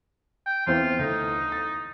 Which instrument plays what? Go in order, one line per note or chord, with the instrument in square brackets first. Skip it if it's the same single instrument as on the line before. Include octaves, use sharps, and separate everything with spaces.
[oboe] G5
[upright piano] E2 E3 C4 [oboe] F4
[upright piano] D2 [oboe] D#4
[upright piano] A6